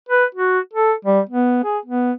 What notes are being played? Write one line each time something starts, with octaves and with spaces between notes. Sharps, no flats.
B4
F#4
A4
G3
B3
G#4
B3